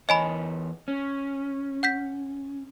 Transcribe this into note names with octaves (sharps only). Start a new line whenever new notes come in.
E2 C#5 D#5 G#5 B5
C#4
F#5 G6 B6